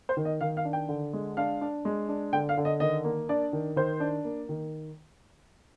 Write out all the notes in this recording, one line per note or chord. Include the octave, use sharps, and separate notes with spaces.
C5
D#3
D#5
D#3 F5
F5
D4
G5
D3
G#3
D4 F5
D4
G#3
D4
D3 G5
F5
D3
D#5
D#3 D#5
A#3
D4 D5
D#3
D#3 C5
D4
A#3
D#3